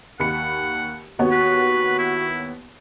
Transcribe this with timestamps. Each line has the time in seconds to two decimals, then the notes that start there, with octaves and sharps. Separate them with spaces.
0.20 D#2 F#5 B5 C#7
1.19 D#2 B3 F#4 C#5
1.32 B4
1.99 E4